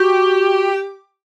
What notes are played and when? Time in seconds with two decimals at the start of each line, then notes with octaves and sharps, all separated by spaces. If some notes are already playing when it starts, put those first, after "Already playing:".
Already playing: F#4 G4